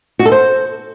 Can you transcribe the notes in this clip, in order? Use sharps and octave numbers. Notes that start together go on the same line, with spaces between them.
F#4
A4
C5